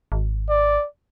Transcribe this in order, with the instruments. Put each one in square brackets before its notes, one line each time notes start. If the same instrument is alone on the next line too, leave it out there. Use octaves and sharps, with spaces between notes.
[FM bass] G#1
[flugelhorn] D5